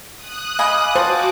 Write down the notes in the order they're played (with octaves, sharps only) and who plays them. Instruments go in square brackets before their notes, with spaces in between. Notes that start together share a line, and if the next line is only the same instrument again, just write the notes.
[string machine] D#6 F#6
[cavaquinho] D#5 B5 D6 [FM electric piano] F5 G#5
[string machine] F#4 D6 [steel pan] C5 [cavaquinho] A5